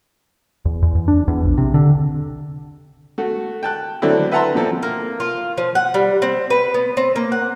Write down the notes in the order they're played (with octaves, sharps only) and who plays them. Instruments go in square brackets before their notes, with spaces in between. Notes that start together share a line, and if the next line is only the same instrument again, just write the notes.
[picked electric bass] E2
E2
E2
D4
E2
A#1
C3
D3
[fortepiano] A3 F#4
G5 A5 F#6
D3 F#3 A3 C4 D4 E4
B4 E5 F#5 A5 A#5 C6
A#2 F3 C4 A4
[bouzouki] A#3
F4
F3
F#5
G3
C4
B4
B3
C4
A#3
F#5